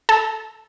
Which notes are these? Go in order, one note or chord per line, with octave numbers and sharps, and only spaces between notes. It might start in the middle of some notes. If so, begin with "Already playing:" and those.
A4